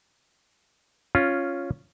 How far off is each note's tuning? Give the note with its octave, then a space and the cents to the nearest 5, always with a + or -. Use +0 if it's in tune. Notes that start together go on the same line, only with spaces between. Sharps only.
C#4 +0 F4 +0